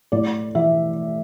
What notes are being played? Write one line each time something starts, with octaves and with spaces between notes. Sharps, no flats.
A2 D5
E3 E5